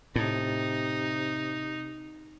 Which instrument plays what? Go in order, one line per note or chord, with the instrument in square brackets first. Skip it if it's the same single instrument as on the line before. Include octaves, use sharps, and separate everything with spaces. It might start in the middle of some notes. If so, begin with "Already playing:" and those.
[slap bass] A2 [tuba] C3 [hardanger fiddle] D#4